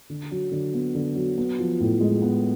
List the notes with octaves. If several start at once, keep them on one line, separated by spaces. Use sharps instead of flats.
D3
F#3
D3
B3
D3
F#3
B3
F3
A2
G#3
B3